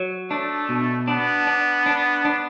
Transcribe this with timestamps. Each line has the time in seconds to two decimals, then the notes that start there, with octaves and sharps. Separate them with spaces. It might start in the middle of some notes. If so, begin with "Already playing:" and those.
Already playing: F#3
0.31 A3 D4
0.69 B2
1.08 B3 D4
1.47 D4
1.86 D4
2.25 D4